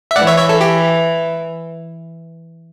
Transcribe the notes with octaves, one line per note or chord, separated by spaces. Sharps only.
E5
E3 D5 F#5
C#5 E5
C#5 E5
A4
G4